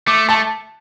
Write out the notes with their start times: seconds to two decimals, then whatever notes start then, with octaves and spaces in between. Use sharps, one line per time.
0.07 A3 D6
0.29 A3 A5